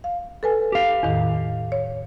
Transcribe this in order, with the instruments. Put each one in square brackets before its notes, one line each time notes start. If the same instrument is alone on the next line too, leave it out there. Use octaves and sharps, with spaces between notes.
[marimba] F5
A4 B4 G#5
[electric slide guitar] G4 F5
[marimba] E2 A2 D#3
C#5